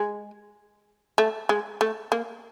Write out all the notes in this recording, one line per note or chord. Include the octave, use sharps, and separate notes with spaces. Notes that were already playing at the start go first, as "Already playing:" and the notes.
Already playing: G#3
A3
G#3
A3
A#3